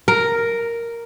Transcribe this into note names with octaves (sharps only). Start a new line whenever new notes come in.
A#4